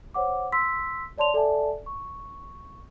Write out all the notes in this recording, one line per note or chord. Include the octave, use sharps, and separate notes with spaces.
C5 C#5 F#5 D6
C6 E6 B6
C#5 D5 A5 C6 F7
A4 D5 E5 G#5 A5
C#6